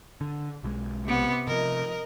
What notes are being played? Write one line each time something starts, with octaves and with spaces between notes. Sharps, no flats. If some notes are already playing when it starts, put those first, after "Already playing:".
D3
B1 E3 G#3
C3 B3
C3 F3 A#4 D#5